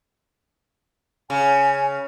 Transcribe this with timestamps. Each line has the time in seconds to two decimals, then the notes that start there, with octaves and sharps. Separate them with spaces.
1.30 C#3 G#5